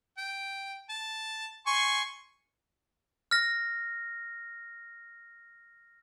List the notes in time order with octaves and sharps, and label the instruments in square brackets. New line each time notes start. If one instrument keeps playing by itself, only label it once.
[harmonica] G5
A5
G#5 C6 C#6
[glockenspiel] F6 A#6